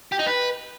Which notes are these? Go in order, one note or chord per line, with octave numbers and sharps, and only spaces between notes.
G4
D#4
B4